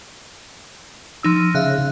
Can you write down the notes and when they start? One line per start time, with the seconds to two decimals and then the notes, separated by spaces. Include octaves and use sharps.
1.23 F3 D#4 E6
1.54 C#3 E5 F5 F#6